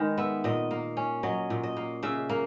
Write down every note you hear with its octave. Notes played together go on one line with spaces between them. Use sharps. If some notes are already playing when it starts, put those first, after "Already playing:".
Already playing: D#3 G#3 B4
B3 E5
A#2 D#5
A#3
C#4
F#3 D#5
A#2
D#5
A#3
C#3 E5
A#3